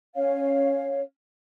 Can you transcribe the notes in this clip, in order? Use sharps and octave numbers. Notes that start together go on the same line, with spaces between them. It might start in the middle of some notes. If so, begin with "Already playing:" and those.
C#4 C#5 F5